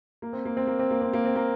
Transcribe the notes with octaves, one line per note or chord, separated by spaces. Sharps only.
A#3
C4
A#3
C4
A#3
C4
A#3
C4
A#3
C4
A#3